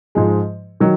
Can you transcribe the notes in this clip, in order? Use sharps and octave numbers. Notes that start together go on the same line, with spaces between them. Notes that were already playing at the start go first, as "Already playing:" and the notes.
G#2 F3 G#3
D#3 F#3